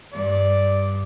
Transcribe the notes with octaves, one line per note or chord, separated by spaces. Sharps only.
G2 D5